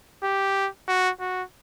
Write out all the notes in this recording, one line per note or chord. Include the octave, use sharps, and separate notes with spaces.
G4
F#4
F#4